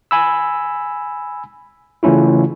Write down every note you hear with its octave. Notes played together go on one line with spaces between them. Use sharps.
G#5 B5 E6
C#3 E3 A3 C#4 E4 F4